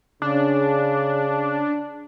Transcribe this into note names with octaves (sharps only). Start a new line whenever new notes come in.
C#3 D4